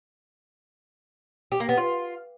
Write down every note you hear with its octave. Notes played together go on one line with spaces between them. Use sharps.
G4
A#3
B3
F4